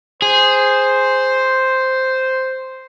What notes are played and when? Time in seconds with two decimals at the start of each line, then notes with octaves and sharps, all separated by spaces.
0.22 G#4 C5